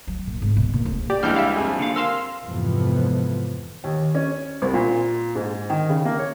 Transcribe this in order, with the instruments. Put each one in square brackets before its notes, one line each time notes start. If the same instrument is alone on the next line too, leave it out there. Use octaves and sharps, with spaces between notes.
[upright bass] F#3
A#2
G#1
B2
A#2
D1
[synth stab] G4 [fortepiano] D5
[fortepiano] C#2 E3 G#3 [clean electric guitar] G3 A#3 D4 [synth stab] F6 G6
[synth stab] E5 F5
[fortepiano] F2 G#4
[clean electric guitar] D3 G3 F5
[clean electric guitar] A#4 [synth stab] F5 C6 E6
[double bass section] F2 G#2 C3 E3 F3 B3
[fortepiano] D#2
C#4
C2
A#2
G#2
D#3
C#3
A#3
C#5